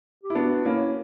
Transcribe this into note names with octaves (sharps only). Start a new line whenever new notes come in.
G4
E4
B3 D4 F#4
A#3 C#4 E4